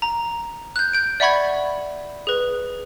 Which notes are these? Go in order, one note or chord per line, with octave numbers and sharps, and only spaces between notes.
A#5
F#6 G6
G6 D7
D5 E5 F#5 B5 C#6 G#6
G#4 B4